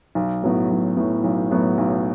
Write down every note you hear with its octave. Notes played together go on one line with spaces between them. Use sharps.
B1
A2 F#3 B3
B1
A2 F#3 B3
B1
A2 F#3 B3
B1